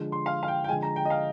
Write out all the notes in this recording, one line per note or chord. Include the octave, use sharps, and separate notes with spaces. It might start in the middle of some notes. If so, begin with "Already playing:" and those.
Already playing: D3 F3 G#3
C6
F5
F5
G5
G5
D3 F3 G#3 G#5
A#5
G5
D#5
F5